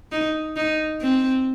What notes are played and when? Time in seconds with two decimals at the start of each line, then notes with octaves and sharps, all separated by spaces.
0.12 D#4
0.57 D#4
1.01 C4